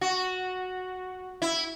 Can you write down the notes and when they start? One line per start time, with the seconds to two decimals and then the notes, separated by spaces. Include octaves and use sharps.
0.01 F#4
1.42 E4